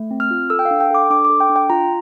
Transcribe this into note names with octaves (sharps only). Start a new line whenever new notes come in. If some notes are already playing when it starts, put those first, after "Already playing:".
Already playing: A3
C4
F6
F4
A4 E6
G5
F5
D4
G5
A4 D6
D4 D6
A4 D6
G5
D4
G5
F4 A#5